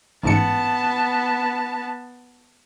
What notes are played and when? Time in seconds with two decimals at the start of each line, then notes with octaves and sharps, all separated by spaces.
0.23 A1 G#2 B3 A5 C#7